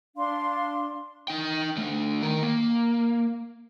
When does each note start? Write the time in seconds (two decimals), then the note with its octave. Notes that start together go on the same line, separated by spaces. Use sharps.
0.16 D4 F5 C6
1.28 D#4 G5
1.77 D3 A3
2.22 D#3 A#4
2.43 A#3